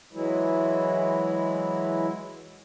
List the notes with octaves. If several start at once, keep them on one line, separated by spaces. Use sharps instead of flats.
E3 F#3 G#3 E4